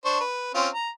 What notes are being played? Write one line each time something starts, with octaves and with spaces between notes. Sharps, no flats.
D4 C5 C#6
B4
C4 C#4 F4
A#5